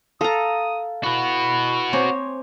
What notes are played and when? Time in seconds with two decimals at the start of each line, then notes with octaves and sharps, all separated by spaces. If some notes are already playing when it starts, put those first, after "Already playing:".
0.21 A4 F5 A#5 D#6
1.04 E4 F#4 B4
1.93 C4 C5 C#5 G#5 A#5 D6